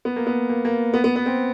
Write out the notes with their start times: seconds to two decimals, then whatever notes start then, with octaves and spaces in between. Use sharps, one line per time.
0.05 B3
0.16 A#3
0.27 B3
0.49 A#3
0.65 A#3
0.94 B3
1.04 B3
1.16 B3
1.26 C4